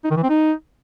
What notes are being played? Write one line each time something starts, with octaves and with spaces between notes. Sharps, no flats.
D#4
D#3
E3
C4
D#4